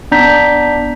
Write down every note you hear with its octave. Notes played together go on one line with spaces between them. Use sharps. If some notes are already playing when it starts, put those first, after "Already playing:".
B3 D4 D5 A#5 G6 B6